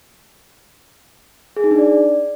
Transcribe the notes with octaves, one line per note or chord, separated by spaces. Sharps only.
G#4
D#4
D4
D5